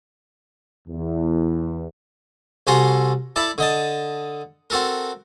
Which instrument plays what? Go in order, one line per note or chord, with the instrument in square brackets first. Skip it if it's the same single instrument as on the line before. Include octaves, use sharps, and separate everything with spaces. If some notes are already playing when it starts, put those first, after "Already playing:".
[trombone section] E2
[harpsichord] C2 F#4 A4 G#5 A#5 C6
E4 A4 D5 A5
D3 D#5 A5
C4 F#4 A4 A#4